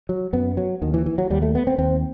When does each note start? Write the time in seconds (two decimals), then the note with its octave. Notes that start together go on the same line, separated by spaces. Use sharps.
0.09 F#3
0.33 F#2 B3
0.57 F#3
0.82 D#2 D#3
0.94 E3
1.06 E3
1.18 F#3
1.30 D#2 G3
1.42 A3
1.55 B3
1.67 C4
1.78 D#2 C4